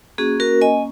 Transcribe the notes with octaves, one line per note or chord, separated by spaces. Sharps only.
A#3 C#4 F#4 G#4
F#4 A#4
D#5 G#5